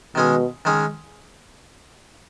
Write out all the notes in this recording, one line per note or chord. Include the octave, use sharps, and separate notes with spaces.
B2 D#3 G#3 C#4 G#4
D#3 G#3 C#4 G#4